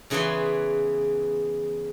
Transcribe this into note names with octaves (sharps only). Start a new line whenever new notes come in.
E2 C#3 E3 G#4 B4 C6